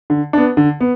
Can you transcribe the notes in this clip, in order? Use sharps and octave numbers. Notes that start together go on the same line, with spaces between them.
D3
B3 D4
D3
B3